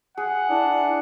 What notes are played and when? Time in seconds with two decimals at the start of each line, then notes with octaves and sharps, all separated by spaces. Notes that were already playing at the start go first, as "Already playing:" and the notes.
0.18 G#4 F#5
0.50 D4 E4